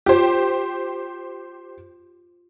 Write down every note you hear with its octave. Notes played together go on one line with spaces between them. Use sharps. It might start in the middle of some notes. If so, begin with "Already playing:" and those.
F4 G4 C5